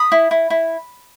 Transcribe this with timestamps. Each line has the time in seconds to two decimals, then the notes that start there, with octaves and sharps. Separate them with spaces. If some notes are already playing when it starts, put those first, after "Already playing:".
Already playing: B5 D#6
0.12 E4
0.31 E4
0.50 E4